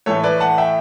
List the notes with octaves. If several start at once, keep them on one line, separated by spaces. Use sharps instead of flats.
A2 E3 A3 A4 C#5
B4 D5
F#5 A5
E5 G5